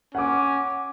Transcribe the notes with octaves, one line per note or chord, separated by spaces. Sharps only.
C#4 F#5 D6